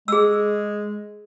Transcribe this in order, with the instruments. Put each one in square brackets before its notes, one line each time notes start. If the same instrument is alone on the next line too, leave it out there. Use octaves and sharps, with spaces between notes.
[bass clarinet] G#3 [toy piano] G#4 E6